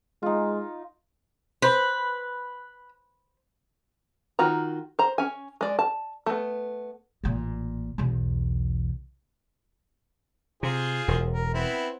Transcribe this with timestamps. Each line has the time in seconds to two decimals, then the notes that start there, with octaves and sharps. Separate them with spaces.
0.23 G#3 D#4 F4
1.62 B4 C5
4.39 D#3 F4 F#4 A#5
4.99 C5 A#5
5.18 C#4 G#5
5.61 G#3 D5
5.79 A5
6.26 A3 B3
7.24 A1 A#2
7.98 B1 E2
10.63 C3 F4 G#4 C5
11.08 E1 E2
11.33 A#4
11.54 B3 C4 E4